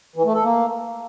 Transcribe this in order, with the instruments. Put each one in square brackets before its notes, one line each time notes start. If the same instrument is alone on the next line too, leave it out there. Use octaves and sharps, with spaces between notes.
[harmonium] E3
A3
A4
A#3